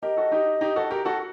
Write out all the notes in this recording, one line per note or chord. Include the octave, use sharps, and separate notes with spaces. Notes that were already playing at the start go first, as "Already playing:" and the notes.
G4 A#4 D#5
F#4 A4
D#4 G4
D#4 G4
F#4 A4
G4 A#4
F#4 A4